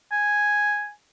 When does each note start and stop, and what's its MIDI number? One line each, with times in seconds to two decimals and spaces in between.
0.12 0.90 80